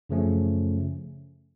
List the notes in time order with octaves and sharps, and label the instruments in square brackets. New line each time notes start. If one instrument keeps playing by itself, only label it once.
[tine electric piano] F#2 C#3 F3 A3 C#4